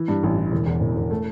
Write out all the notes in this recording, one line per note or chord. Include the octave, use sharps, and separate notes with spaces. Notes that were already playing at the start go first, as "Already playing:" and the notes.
Already playing: E3
G2
A1
E3
E1
E2
E1
E1
A3